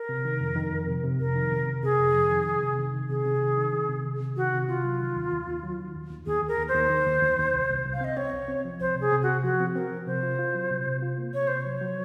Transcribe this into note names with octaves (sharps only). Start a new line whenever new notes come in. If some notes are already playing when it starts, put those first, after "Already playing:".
Already playing: A#4
C3
D#3
F2
D#3
F2
C3
C3
F2 A#4
D#3
C3
C3
C3 G#4
F2
F2
D#3
C3
C3
D#3
D#3
C3 G#4
C3
D#3
D#3
D#3
C3
D#3
C3
D#3 F#4
C3
C3 F4
F#3
D#3
D#2
D#2
D#2
F#3
D#3
D#2
D#2
D#2 G#4
D#2
A#4
D#2
C5
D#2
D#3
D#2
D#2
D#2
C2
C2
C2
F5
C4 D#5
C4 C#5
C2
C4
F3
C2 C5
C3
G#4
C3
C3 F#4
F3 F#4
C4
C4 A#4
F3
C3 C5
F4
F4
F#3
C3
C3
F4
A#3
C3 C#5
C3 C5
F#3 C#5
F#3